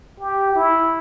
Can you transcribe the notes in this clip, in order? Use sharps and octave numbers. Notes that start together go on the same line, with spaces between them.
G4
E4